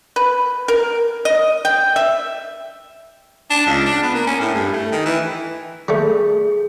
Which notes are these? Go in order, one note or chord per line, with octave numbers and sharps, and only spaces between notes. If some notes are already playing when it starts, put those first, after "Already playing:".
B4
A#4
D#5
G5
E5
D4
C#2
D4
B3
A#3
C#4
A2
G2
A3
D#3
E3
G3 A3 G#4